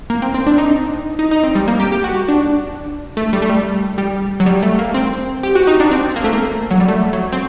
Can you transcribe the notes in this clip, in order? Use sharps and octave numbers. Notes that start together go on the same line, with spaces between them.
A#3
C4
C4
D4
D#4
D#4
D#4
C4
G3
A#3
G4
G4
F#4
D4
A3
G3
A3
G3
G3
F#3
G3
A3
A#3
C4
G4
F#4
D#4
D4
C4
A#3
A3
A#3
F#3
G3
A3
F#3
C4